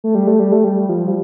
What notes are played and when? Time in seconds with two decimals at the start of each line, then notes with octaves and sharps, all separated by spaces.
0.04 A3
0.15 G3
0.27 A3
0.40 G3
0.52 A3
0.64 G3
0.80 G3
0.89 F3
1.08 G3